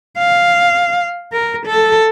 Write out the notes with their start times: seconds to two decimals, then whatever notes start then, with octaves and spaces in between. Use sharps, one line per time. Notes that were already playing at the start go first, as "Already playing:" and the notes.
0.18 F5
1.32 A#4
1.66 A4